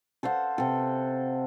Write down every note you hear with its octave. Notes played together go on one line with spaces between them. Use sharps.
A4 C5 F5 F#5
C3 A4